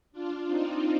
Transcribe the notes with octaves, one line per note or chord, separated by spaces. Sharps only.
D4 F4
C4 D#4